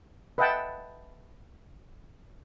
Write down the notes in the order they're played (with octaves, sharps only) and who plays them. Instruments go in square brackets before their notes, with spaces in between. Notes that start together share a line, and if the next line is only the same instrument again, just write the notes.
[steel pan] B4 D#5 E5 F#5 G5 A5